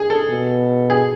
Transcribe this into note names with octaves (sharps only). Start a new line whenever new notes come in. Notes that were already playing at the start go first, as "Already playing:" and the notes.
Already playing: G#4
A4
B2
G#4